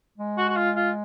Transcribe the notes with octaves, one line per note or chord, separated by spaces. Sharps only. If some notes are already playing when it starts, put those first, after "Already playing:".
G#3
F#4
F#4
F4
F4